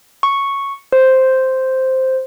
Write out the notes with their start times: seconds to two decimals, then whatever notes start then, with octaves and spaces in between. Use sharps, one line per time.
0.23 C#6
0.92 C5